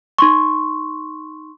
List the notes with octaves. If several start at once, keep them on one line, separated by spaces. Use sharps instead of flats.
D#4 C6 C#6